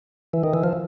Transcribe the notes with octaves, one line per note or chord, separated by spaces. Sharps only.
E3
D#3
E3
F3